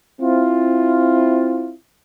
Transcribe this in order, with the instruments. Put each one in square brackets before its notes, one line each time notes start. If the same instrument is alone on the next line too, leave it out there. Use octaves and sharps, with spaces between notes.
[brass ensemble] C4 E4 F4